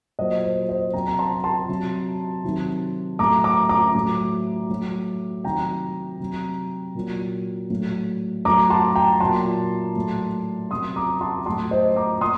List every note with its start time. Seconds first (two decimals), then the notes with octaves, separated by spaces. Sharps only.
0.19 A#2 F#3 C5 D#5
0.44 C5
0.69 C5 D#5
0.93 C3 F#3 G5 A#5
1.07 A#5
1.19 A5 C6
1.44 A5 C6
1.69 C3 F#3
2.44 C3 D#3 F#3
3.19 A2 F#3 A#5 D6
3.44 A#5 D6
3.69 A#5 D6
3.95 A2 F#3
4.69 A2 F#3
5.44 C3 D#3 F#3 G5 A#5
6.20 C3 F#3
6.95 A#2 F#3
7.70 A2 F#3
8.45 A2 F#3 A#5 D6
8.70 A5 C6
8.95 G5 A#5
9.20 A#2 F#3 A5 C6
9.96 A2 F#3
10.71 C3 F#3 C6 D#6
10.96 A#5 D6
11.21 A5 C6
11.46 A2 F#3 A5 C6
11.71 C5 D#5
11.96 A#5 D6
12.21 A#2 C6 D#6